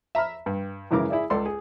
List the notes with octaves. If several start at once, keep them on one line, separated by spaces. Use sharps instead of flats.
E5 A#5 B5 F6
G2
F#2 C#3 E3 G#3 A#4 D6
E4 G#4 D5 E5
C#2 A4 D5 C6
G#4